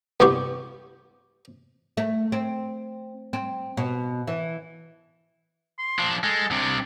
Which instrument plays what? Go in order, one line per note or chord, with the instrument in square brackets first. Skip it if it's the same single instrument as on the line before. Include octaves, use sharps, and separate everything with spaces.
[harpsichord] C2 G2 G3 B3 G4 C#6
[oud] A3
C4
C4
B2
E3
[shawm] C6
[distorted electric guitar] F3 D4
[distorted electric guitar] G#3 [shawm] A4
[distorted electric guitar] C2 C3 [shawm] D4